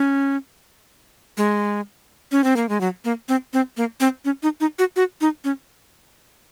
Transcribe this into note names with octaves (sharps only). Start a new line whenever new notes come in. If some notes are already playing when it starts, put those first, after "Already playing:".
Already playing: C#4
G#3
C#4
C4
A#3
G#3
F#3
A#3
C4
C4
A#3
C4
C#4
D#4
D#4
F#4
F#4
D#4
C#4